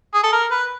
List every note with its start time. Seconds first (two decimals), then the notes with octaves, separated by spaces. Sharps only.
0.14 G#4
0.23 A4
0.33 A#4
0.51 B4